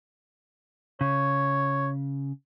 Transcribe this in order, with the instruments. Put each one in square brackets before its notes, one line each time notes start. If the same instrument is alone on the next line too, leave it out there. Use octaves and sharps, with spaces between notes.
[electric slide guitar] C#3 [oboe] C#5